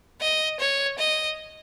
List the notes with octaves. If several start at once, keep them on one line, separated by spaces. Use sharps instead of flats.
D#5
C#5
D#5